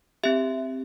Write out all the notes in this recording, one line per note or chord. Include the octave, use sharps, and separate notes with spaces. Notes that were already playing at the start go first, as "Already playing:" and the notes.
C4 G4 E5